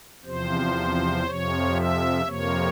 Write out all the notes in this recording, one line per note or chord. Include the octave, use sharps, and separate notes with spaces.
E2 C3 F3 C5
F2 C3 F3 C#5
E5
F2 C3 F3 A#3 C#5